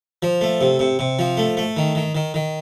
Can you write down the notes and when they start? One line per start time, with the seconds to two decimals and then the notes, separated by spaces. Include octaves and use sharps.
0.22 F3
0.41 A3
0.61 C3
0.79 C3
0.99 C3
1.19 F3
1.37 A3
1.57 A3
1.77 D#3
1.95 D#3
2.15 D#3
2.34 D#3